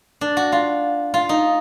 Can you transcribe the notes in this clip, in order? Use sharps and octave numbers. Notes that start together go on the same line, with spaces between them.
D4
F#4
F4
F4
D#4